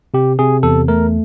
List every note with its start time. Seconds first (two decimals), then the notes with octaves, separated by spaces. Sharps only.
0.14 C3 G4
0.39 C3 G#4
0.63 E2 A4
0.88 A3 A#4